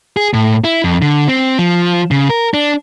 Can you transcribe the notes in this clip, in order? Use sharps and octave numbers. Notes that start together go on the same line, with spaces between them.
G#4
A2
E4
F2
D3
C4
F3
C#3
A#4
D4